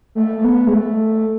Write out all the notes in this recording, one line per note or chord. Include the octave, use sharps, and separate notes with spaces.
A3
A3
B3
G#3
A3